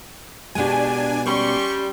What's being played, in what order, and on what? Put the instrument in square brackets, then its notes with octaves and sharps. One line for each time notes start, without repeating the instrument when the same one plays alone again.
[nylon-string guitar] B2 G#3 [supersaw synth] D4 G#5 [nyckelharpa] G4
[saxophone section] G3 [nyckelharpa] C#4 C6 [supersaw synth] C#6